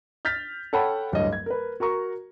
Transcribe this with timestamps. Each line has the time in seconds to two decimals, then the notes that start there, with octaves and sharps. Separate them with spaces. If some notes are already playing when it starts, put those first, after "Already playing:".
0.25 F6 G6 A6 B6
0.73 A4 C#5 F#5 G5 A5 B5
1.12 D1 G2 C#5 D#5
1.33 G#6
1.46 A#4 B4
1.80 F#4 A#4 A#5 C#6